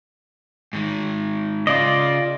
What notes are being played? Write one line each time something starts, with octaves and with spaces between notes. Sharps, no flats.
G#2 D#3
C#3 F4 D5 D#5